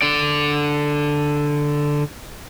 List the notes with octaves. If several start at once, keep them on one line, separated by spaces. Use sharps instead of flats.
D3 D5